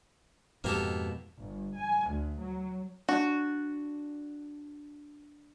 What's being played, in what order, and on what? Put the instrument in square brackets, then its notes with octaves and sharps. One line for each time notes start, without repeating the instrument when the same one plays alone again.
[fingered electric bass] F2 G#2 B2 [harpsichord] A#3 G4 A4
[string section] G1
G#5
D2
F#3
[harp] D4 [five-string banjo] F#4